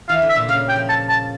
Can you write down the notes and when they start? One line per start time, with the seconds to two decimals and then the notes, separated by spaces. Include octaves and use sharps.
0.09 E3 F5
0.22 D3
0.29 E5
0.36 A#2
0.49 C#3 F5
0.69 G5
0.76 F3
0.89 A5
1.09 A5